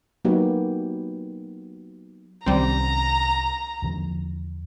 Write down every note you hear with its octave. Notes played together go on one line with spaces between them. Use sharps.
F#3 A#3 B3 D#4 F#4 G4
C2 D#3 G3 C4 C#4 A#5
E2 D3 F3